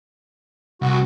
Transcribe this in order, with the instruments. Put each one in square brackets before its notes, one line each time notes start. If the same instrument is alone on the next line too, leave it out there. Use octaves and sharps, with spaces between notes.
[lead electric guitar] C2 [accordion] F#4